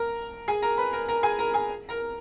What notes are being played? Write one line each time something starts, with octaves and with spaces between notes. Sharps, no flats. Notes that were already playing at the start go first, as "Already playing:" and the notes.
Already playing: A#4 A#5
G#4 G#5
A#4 A#5
B4 B5
A#4 A#5
A#4 A#5
G#4 G#5
A#4 A#5
G#4 G#5
A#4 A#5